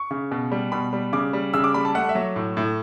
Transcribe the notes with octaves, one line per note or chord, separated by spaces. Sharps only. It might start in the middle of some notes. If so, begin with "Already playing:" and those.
Already playing: C#6
C#3
B2
G3
B2 B5
G3
C#3 D6
G3
C#3 E6
D6
G3 B5
A5
A3 F#5
E5
F#3
A2
A2